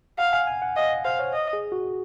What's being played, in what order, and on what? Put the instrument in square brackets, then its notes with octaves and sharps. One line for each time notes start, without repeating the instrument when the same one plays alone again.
[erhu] F5 [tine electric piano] F#5
[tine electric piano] G#5
G#5
F#5
[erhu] D#5 [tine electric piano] F5
[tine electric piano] C5 [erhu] F5
[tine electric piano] C#5
[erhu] D#5
[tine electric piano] G#4
F#4